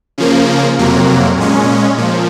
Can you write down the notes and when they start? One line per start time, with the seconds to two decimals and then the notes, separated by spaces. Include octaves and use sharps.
0.18 C#3 F3 A#3
0.79 F2 C3 F#3 A#3
1.37 A#2 G#3 C#4
1.98 A#2 F3